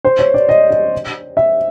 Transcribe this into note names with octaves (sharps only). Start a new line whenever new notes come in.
C5
C#5
D5
D#5
D#5
E5